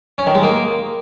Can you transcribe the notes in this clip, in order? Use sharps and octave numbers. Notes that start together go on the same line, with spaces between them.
C#4
D#3
G#3
A#3